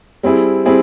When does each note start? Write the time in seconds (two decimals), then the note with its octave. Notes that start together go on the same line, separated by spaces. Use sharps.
0.23 G3 C4 E4 G#4
0.65 G3 C4 E4 G#4